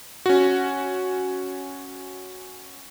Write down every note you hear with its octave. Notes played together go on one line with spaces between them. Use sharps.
C#4 F#4